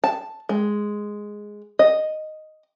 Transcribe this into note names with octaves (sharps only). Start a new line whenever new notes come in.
A5
G#3
D#5